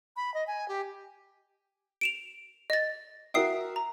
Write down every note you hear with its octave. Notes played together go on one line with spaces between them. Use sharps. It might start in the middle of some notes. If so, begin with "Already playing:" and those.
B5
D#5
G#5
G4
D7 E7 F7
D#5 A6
F#4 A#4 E5 G5 D#6 C7
A#5